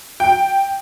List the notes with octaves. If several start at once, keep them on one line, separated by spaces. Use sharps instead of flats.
G5